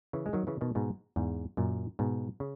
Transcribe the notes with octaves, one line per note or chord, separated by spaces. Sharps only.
C#3 E3
G#3
D#3 F#3
C#3 E3
B2 D#3
G#2 B2
E2 G#2
F#2 A#2
G#2 B2
C#3